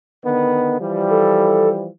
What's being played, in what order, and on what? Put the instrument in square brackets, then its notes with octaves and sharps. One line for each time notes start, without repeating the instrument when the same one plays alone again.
[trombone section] D3 D#3 B3
E3 F3 G3
[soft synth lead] A4